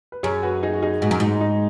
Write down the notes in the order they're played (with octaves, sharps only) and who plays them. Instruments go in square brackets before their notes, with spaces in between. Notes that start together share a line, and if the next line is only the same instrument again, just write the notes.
[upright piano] B4
[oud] F#2 [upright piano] G#4 C#5
[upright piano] F#4 B4
D#4 G#4
F#4
D#4 G#4
[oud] G#2 [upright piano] F#4
[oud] F#2
[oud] G#2 [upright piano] D#4
[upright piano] D#4